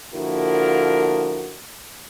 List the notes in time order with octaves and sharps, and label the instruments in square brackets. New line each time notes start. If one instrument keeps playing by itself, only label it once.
[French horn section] D3 F3 A#3 E4 F#4 A#4